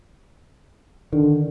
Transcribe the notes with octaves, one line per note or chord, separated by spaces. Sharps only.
D3 D#3